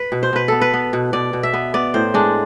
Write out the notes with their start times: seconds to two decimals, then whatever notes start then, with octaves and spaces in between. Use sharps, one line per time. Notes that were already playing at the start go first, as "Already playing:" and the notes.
Already playing: B4
0.12 B2
0.23 C5
0.33 B2 B4
0.48 B3 A4
0.61 B4
0.73 B3
0.93 B2
1.13 B2 D5
1.33 B2
1.43 E5
1.53 B3
1.74 B3 D5
1.94 A2 C5
2.14 G#3 D4